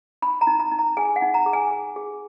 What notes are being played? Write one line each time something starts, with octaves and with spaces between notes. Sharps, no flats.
D#4 B5
A#5
D#4
A#5
D#4
A#5
G#4 G#5
F#5
D#4
A#5
G#4
G#5
G#4
G#4